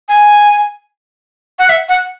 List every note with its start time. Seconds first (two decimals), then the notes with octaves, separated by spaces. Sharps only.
0.09 G#5
1.59 F#5
1.69 E5
1.89 F#5